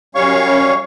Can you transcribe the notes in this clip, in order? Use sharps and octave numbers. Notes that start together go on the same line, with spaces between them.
F#2 G3 C#4 C#5 F5 C#6